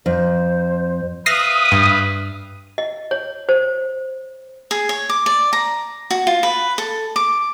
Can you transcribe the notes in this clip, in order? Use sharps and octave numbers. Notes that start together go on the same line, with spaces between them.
F2 C5
B4 E5 F5 D#6 A#6 C7
G2
D#5
C#5
C5
G#4
C#5
D6
D5
A#5
F#4
F4
B4
A4
D6